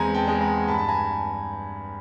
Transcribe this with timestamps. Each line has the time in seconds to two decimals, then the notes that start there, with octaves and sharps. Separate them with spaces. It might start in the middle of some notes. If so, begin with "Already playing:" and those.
Already playing: E2 G#3 C4 G#5 A#5
0.14 G5 A5
0.28 G#3
0.41 G#5 A#5
0.68 G2 A5 B5
0.78 A5
0.88 G#5 A#5